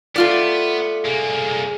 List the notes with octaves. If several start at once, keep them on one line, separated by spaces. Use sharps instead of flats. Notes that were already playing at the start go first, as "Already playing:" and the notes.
A3 B3 F4 D5
C2 A#3 G#4